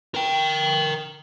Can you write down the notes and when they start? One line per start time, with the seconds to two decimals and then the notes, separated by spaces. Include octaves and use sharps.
0.15 A#4 G5